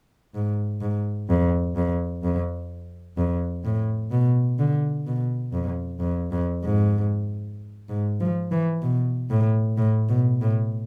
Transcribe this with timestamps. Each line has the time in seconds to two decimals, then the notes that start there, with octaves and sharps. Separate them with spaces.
0.34 G#2
0.81 G#2
1.29 F2
1.76 F2
2.24 F2
3.17 F2
3.64 A2
4.11 B2
4.58 D3
5.06 B2
5.53 F2
6.00 F2
6.32 F2
6.64 G#2
7.89 G#2
8.20 F3
8.51 E3
8.82 B2
9.30 A2
9.77 A2
10.09 B2
10.41 A2